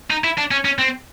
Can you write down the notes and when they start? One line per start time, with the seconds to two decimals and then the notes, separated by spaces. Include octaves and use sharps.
0.10 D#4
0.24 E4
0.38 D4
0.51 C#4
0.65 C#4
0.79 C4